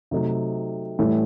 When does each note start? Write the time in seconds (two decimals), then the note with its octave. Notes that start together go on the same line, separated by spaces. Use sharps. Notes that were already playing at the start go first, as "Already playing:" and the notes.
0.11 C3 F#3 A3 D#4
0.99 A2 E3 G3